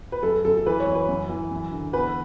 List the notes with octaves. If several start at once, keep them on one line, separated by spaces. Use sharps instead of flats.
B4
F#2 A4
F#2 A4
A4
E3 B4
C#5
F#2
B4
F#2
E3
F#2
D3
E2 B4